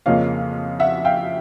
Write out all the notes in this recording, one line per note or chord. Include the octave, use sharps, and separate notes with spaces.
F2 C#3 F3 A#3 C#4 D#5 F5
E5 F#5
F5 G5